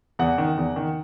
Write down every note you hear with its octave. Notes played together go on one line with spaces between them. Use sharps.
E2 F#5
D#3
E2
D#3